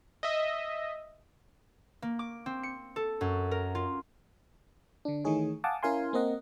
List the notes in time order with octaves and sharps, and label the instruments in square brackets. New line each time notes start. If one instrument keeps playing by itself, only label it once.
[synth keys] D#5 E5
[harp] A#3
D6
C4
C#7
A4
F#2
A#4
F4
[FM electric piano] D3 D4
D#3 E3 A3 D#4 G#4 C#5
F5 F#5 G#5 A5 D6 D#6
C#4 E4 A#4 F5 G#5 C6
A#3 C4 A#4 D#5 F#5